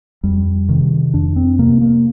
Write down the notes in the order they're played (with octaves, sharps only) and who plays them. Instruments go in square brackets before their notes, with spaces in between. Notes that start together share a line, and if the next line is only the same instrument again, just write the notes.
[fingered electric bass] F2 G3
C3 D#3
F2 D4
C4
C3 A#3
A#3